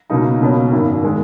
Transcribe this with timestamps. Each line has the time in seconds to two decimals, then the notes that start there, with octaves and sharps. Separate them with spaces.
0.10 C#2 B2 F#3 A#3 D#4
0.41 C#2 B2 A#3 C#4
0.72 G#1 F#2 D#3
1.04 D#3 G#3 B3